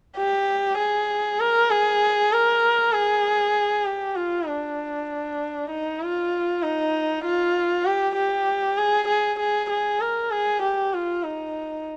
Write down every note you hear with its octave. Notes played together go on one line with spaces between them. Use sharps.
G4
G#4
A#4
G#4
A#4
G#4
G4
F4
D4
D#4
F4
D#4
F4
G4
G4
G#4
G#4
G#4
G#4
A#4
G#4
G4
F4
D#4